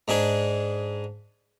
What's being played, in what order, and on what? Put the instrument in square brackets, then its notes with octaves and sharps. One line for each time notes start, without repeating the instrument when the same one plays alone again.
[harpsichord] G#2 D4 G#4